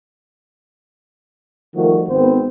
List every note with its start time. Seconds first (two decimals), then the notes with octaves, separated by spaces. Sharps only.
1.75 D#3 F3 G3 A3 F#4
2.09 G#1 D#3 B3 C4 C5